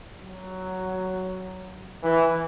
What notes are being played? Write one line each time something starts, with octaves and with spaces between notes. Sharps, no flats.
F#3
E3